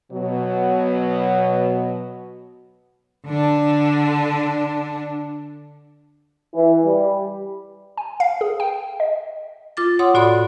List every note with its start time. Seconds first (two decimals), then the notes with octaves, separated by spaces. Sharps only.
0.12 B2 F#3
3.26 D3 D4
6.54 E3
6.85 G3
7.97 G#5
8.20 F5
8.41 G#4
8.60 G5
9.00 D#5
9.77 F4 D6 A6
9.99 C#5 F#5 C6 D#6
10.14 A2 F#4 D5 B5 C6